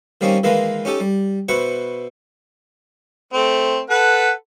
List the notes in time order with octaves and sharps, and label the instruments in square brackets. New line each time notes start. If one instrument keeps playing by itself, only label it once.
[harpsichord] D#3 G3 A#3 C4 C#4 D#4
D#3 E3 G#3 A#3 F4 B4
C#4 D#4 G4 A4
G3
B2 E4 B4 C5 C#6
[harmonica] A3 C4
[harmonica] A4 B4 [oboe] F#5